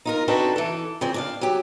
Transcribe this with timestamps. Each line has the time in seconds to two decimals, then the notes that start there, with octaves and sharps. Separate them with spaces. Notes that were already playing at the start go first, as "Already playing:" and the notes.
0.05 D#4 F4 A#4
0.28 C4 D4 D#4 F#4 A4 B4
0.56 E3 A4
1.01 C#3 F3 C4
1.14 D4 D#5 F5
1.41 F#3 G4